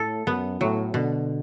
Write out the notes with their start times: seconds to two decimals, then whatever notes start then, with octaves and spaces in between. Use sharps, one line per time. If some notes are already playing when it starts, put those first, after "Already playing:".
Already playing: A2 A4
0.26 F#2 B3
0.60 A2 F#3
0.94 B2 D3